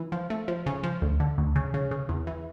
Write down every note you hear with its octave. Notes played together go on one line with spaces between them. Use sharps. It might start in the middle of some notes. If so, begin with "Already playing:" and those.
Already playing: E3
F3
A3
F3
C#3
F3
D2
D3
D2
C#3
C#3
C#3
E2
E3